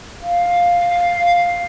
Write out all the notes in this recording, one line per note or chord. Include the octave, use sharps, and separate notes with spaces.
F5